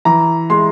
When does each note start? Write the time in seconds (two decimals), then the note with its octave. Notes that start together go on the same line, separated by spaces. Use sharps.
0.05 E3 A#5
0.50 G#3 C6